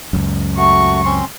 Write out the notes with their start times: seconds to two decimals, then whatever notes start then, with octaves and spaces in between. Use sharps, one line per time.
0.13 C#2 F#2
0.57 A3 F#4 C#6
1.05 C4 C#4 C6